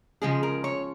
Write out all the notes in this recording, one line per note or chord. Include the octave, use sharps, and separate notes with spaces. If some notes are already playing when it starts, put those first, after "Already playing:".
C#3 F3 G#3 G#4
A#4
C#5